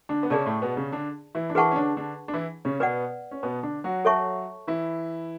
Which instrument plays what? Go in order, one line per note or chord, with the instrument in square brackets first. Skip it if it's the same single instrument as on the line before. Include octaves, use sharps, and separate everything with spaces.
[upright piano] D3 D4
B3
[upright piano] C#3 C#4 [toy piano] G#4 D5 A5
[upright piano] A2 A3
B2 B3
C#3 C#4
D3 D4
E3 E4
D4
[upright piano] E3 E4 [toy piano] G#4 B4 F#5 A5 C#6
[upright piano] C#4
D3 D4
D3 D4
D4
E3 E4
C#3 C#4
[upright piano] B2 B3 [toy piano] B4 D5 F#5
[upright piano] C#4
B2 B3
D3 D4
F#3 F#4
[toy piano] A4 C#5 E5 A5 C#6
[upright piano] E3 E4